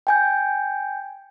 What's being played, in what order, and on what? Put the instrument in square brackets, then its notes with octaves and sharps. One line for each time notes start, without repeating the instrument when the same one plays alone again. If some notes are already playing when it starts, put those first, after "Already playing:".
[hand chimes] G5 G#5 G6